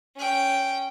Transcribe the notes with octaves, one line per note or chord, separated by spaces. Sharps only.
C#4 G5